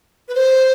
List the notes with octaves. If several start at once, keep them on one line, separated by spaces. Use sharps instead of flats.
B4
C5